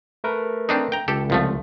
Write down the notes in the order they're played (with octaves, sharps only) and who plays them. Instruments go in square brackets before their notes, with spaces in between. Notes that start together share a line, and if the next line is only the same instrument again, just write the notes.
[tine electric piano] A3 A#4 B4
[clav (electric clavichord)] C4 D4 D#4
G5 A#5
[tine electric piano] C#2 [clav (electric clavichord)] G4 A4
[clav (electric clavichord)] C2 F3 A3